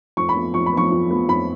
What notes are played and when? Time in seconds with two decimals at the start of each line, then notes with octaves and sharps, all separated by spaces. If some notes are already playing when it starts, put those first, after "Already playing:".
0.17 F2 C#6
0.29 B5
0.36 F3 B3
0.54 F2 C#6
0.66 B5
0.73 F3 B3 C#6
0.92 F2
1.10 F3 B3
1.28 F2 B5